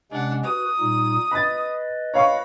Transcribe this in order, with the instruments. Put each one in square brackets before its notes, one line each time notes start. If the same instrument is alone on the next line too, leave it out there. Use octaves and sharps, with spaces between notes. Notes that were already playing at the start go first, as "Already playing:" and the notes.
[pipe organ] C3 G#3 C#4 [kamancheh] D4 F#5
[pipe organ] F#4 B4 [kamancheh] D#6
[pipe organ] A#2 G3 D#4
[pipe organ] B4 D#5 [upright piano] B5 A6
[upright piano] C#5 F5 C#6 [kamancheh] B5